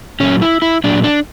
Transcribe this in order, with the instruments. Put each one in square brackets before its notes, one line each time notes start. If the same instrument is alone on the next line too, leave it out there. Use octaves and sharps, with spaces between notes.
[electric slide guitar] A#2 F#3 C#4
E4
E4
A#2 F#3 D4
D4